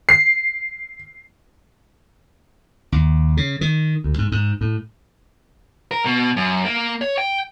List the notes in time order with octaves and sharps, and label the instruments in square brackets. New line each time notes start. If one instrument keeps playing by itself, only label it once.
[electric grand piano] C7
[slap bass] D#2
C#3
D#3
D2
G#2
G#2
A2
[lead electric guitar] A#4
B2
F#2
A#3
C#5
G5